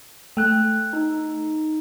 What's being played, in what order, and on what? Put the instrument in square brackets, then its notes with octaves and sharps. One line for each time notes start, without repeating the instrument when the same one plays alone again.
[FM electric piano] A3 [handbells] G5 F#6
[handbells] D#4